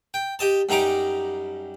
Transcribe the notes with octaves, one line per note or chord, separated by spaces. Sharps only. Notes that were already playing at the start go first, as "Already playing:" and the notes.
G5
G4 D#5 A5
F#2 G3 D#4 A#5 D6